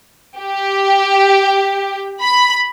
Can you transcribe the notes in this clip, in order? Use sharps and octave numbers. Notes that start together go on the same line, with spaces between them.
G4
B5